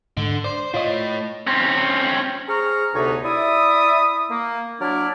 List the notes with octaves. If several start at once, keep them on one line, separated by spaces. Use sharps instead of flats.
G#2 D3
C5 D5
A2 F4 C#5 D#5
C4 C#4
G#4 C5 A#5 C#6 F6
D2 C3 B3 D#4 C#5
E4 D5 E5 D#6
A#3
F#3 D4 E4 D5 F6